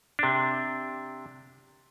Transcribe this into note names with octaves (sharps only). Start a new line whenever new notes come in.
C3 D4